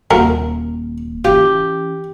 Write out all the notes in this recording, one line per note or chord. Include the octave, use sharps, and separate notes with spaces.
D#1 C2 D#3 F4 F#4 A#4
E3 C#4 F4 G4